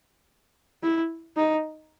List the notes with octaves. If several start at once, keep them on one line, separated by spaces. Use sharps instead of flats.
E4
D#4